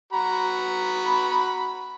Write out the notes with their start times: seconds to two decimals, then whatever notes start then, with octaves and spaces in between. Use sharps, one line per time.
0.13 F#4 A#5 B5